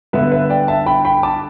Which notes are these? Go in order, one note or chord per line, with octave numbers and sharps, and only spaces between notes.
G2 D3 B3 B4 E5
B4 E5
D5 G5
E5 A5
G5 B5
G5 B5
A5 D6